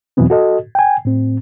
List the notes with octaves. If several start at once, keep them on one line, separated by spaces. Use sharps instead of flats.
E2 B2 E3 F#3 B3 C4
F#4 A4 D#5
G5 G#5
A2 C4